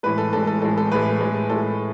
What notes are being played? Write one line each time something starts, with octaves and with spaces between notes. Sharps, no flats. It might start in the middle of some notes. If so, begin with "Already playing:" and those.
A2 E3 G#3 B4
A4
A2 E3 G#3 A4
A4
A2 E3 G#3 A4
A4
A2 E3 G#3 B4
A2 G#3
A2 G#3 A4